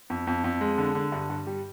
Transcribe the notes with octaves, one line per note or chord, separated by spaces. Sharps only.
F2
F2
F2
G#3
D3
D3
G2
G2
G3